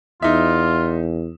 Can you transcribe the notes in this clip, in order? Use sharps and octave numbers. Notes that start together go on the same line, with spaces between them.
E2 D#4 F4 E5